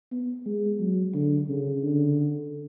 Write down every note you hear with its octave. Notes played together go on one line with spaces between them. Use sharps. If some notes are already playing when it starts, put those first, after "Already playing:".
B3
G#3
F#3
D3
C#3
D3